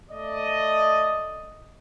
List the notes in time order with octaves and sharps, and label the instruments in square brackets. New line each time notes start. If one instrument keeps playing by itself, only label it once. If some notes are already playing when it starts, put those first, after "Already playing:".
[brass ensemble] A3 D5 D#5